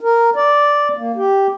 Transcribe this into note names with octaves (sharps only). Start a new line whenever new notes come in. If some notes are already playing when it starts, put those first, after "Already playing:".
A#4
D5
A#3
G4